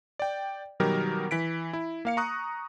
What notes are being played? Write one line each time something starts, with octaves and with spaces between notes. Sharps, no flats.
D5 G5
B2 D#3 F#3 G3 G4 A#4
E3 B6 D7
E4
A#3 F5 C#7
A#5 C#6 D#6 F#6